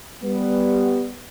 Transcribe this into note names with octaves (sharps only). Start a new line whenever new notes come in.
G3 B3